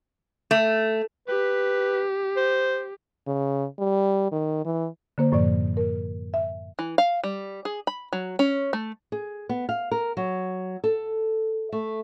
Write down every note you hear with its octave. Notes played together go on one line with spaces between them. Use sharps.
A3
G4 B4
C5
C#3
G3
D#3
E3
D3 A#3 C5
F#2 A2 F3 D5
A#4
E5
E3
F5
G3
G#4
B5
F#3
C#4
A3
G#4
B3
F5
A#4
F#3
A4
A3